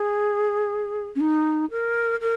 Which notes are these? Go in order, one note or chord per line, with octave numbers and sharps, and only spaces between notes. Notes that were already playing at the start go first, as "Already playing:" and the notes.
Already playing: G#4
C#4
D#4
A#4
A#4